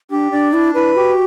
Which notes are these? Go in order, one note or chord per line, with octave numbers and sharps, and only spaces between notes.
D4 G4
D4 D5
D4 E4
E4 B4
F#4 G4